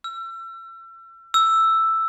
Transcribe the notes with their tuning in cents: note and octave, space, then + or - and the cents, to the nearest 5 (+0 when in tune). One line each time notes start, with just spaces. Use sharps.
E6 +35
E6 +5